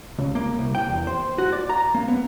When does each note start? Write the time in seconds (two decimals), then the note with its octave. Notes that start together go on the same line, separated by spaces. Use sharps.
0.18 C#2
0.35 A#3
0.59 C2
0.75 G5
0.90 E2
1.07 C5
1.38 F#4
1.53 D5
1.69 A#5
1.95 A#3
2.08 B3